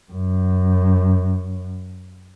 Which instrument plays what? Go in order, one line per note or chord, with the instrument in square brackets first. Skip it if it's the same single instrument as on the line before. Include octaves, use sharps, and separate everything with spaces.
[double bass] F#2